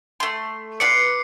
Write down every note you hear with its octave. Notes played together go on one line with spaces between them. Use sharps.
A3 C6
F4 B4 D5 C7 C#7